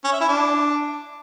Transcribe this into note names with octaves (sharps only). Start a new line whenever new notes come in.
C#4
E5
E4
D4